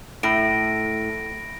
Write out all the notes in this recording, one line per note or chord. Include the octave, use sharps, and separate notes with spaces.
A2 B5 A#6 D7